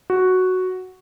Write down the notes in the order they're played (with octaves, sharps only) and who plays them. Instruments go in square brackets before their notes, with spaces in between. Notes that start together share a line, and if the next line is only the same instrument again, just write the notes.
[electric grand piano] F#4